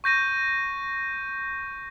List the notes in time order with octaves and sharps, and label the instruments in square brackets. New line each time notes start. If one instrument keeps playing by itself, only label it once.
[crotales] C#6 G6 A#6 D#7